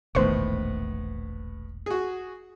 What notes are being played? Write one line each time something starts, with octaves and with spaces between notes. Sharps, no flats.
E1 A#1 A2 D#3 B3 C5 C#6
F#4 G#4